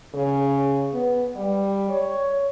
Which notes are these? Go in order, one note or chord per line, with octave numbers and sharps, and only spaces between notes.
C#3
B3
G3
C#5